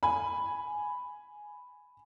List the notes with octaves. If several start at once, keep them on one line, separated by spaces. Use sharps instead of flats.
G#5 B5